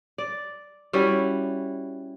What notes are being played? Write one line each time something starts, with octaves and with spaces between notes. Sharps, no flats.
D5
G3 C#4 E4 F#4